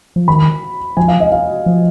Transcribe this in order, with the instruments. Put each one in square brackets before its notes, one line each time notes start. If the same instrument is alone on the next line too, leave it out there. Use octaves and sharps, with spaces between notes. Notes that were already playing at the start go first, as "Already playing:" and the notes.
[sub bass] F3
[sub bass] D#3 [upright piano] B5
[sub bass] F3 [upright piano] G#5
[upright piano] F5
D#5
F5
[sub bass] F3